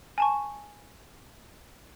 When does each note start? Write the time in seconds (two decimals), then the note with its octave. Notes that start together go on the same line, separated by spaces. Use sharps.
0.18 G#5 A5 C#6